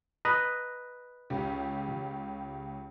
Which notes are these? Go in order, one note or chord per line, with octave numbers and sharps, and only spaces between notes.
B4 D#5 A#5
C#2 C#4 G4